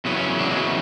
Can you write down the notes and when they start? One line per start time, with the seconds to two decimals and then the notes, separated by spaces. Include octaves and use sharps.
0.05 E2 C#3 F#3 B3
0.17 C#4
0.39 D4
0.50 E2 C#3 F#3 G#3